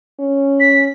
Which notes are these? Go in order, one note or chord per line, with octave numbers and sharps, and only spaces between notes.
C#4
B6